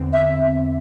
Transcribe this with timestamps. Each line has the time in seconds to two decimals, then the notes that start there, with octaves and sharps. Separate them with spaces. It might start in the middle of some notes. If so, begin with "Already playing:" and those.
Already playing: E2 D3 C4
0.13 E5